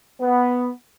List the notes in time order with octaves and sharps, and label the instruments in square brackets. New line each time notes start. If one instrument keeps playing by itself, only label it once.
[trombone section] B3